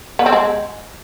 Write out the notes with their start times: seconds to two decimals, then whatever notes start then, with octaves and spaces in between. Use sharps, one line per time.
0.19 B3
0.26 C4
0.32 G#3